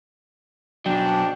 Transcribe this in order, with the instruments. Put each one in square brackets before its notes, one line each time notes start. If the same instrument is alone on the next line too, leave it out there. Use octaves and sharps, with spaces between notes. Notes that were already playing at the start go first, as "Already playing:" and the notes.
[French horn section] G#2 D4 [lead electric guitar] B2 F#3 [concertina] G5